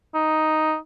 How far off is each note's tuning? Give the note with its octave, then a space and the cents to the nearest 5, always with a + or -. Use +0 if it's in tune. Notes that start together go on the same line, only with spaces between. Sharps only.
D#4 +5